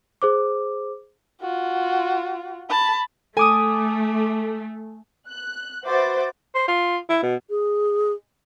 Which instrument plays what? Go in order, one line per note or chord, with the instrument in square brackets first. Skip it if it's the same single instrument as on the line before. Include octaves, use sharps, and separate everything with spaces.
[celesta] G#4 C5 D6
[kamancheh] F4 F#4
A5 B5
[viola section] A3 [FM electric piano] A4 D6 [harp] G#5 D#6
[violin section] F#6
F#4 B4 C5 E5 D6 A6
[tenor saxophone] C5
F4
E4
B2
[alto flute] G#4